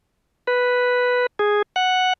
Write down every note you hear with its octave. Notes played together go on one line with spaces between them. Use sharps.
B4
G#4
F#5